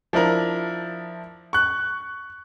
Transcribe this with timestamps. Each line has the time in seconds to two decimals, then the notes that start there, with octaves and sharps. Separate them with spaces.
0.13 F3 D4 E4 A#4
1.53 C#6 F#6